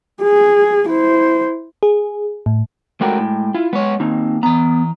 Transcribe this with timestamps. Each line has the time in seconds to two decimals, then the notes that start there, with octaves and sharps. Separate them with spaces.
0.23 G#4
0.89 E4 C5
1.83 G#4
2.46 A2
3.01 G#3 A3 F#4 A#4 G5
3.18 A2
3.55 E4 F4
3.73 G#3 B3 C#5
4.00 D#2 C4 D#4
4.43 E3 B3 A#5